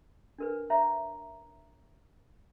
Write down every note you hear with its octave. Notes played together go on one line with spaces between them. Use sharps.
D4 A#4 B4
C#5 E5 A#5